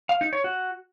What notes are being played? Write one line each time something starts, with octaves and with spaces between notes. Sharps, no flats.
F5
D#4
C#5
F#4